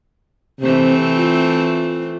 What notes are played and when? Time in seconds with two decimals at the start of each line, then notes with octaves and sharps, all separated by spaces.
0.61 C3 E3 A3 C4
1.16 F4